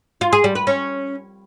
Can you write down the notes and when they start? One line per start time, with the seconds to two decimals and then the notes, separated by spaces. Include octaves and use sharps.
0.21 F4
0.33 G#4
0.44 G3
0.55 B4
0.67 C#4